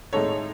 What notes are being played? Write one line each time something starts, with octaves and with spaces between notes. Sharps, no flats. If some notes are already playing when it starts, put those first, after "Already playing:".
A2 G#3 D#4 A4 C#5